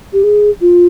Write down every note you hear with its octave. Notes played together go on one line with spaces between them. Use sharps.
G4
G#4
F4